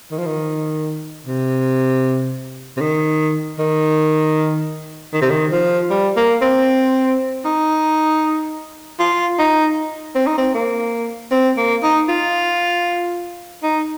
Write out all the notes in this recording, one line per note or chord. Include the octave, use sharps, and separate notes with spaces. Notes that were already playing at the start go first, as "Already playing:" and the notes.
D#3
F3
D#3
C3
C3
D#3
D#3
D#3
C3
D#3
F3
G3
A#3
C4
D#4
F4
D#4
C4
D#4
C4
A#3
C4
A#3
D#4
F4
D#4